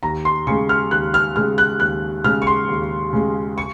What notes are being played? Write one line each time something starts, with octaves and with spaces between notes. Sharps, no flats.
D#2 A#5
C6
C#3 G#3 C#6
F6
D#2 F#6
F6
C#3 G#3 F6
F#6
D#2 F#6
C#3 G#3 F6
C#6
C6
D#2
C#3 G#3
C#6